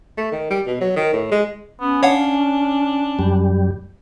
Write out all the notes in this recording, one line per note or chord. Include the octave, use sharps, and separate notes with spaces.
A3
D#3
G3
B2
F#3
D#3
A2
G#3
B3 C#4
D4 C#5 F5 F#5
F#2 G3